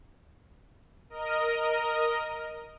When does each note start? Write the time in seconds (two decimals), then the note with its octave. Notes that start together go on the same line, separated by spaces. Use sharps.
1.10 A#4 D#5